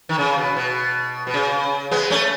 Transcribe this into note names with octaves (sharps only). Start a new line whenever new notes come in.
D#3
C#3
B2
B2
B2
C#3
G#3 B3
A3 C#4